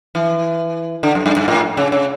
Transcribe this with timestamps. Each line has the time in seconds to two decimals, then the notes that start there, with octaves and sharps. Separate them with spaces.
0.15 E3
1.03 D3
1.15 F#2
1.26 G2
1.37 G2
1.48 A2
1.77 C#3
1.92 C#3